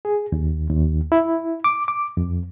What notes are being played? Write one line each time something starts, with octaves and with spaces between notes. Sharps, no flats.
G#4
D#2
D#2
E4
D6
D6
F2